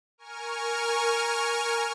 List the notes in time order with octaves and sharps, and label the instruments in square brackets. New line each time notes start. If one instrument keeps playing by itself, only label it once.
[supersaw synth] A#4 G#5 C#6 F6